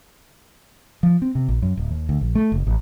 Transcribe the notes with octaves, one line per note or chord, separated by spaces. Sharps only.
F3
C4
C3
A#1
F#2
D1
D#2
D2
A#1
A3
F#1
A1